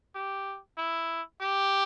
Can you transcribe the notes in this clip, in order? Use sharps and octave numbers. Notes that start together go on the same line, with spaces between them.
G4
E4
G4